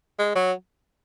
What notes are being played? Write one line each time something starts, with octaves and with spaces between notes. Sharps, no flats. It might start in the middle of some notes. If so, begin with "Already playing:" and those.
G#3
F#3